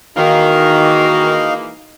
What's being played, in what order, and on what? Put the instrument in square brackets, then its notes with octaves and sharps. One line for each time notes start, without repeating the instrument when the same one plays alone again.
[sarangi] D#3 [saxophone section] E3 G#3 A#3 [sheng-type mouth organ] D#4 F5 [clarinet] F#4